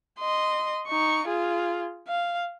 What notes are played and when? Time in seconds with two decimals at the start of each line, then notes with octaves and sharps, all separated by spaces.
0.19 D#5 C6
0.88 D#4 C#6
1.27 F4 G#4
2.08 F5